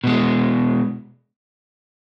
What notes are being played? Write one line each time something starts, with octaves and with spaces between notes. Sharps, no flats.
B2 G#3